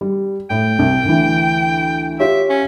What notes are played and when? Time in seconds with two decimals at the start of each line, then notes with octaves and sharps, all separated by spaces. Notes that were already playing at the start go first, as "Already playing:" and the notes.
0.01 G3
0.50 A2 G5
0.79 C2
1.04 D2 E3
2.20 F4 G4 C#5 E5
2.50 C#4